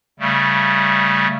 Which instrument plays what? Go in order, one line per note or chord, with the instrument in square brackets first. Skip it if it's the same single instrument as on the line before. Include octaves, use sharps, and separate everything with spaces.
[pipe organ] C#3 G3 A3